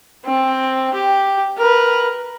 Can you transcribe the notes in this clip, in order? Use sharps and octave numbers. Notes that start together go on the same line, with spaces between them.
C4
G4
A#4 B4